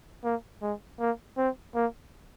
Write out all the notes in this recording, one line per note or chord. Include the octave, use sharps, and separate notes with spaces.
A#3
G#3
A#3
C4
A#3